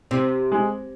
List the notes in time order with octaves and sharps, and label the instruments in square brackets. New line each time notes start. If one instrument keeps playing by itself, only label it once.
[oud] C3 [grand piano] C4
[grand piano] G#3